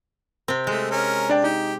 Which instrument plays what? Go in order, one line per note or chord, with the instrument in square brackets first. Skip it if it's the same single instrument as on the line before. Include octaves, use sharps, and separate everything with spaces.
[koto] C3 C4
[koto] G#3 [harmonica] A3
[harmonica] C#4 A#4
[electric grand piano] D4 D5 G5
[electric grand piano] D#4 [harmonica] G4